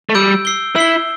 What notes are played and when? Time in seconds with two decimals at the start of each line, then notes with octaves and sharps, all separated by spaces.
0.10 A3
0.15 G3 E6 G6 D7
0.45 E6 C7 G7
0.76 E4 E6 C7 G7